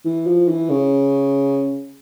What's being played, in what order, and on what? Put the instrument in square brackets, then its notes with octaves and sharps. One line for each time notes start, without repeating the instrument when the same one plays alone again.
[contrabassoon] E3
F3
E3
C#3